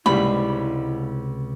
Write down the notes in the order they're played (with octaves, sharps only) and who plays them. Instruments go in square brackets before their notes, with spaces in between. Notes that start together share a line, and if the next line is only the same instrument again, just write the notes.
[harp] C#2 C3 [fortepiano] G#2 G3 [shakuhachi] E4 [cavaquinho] B5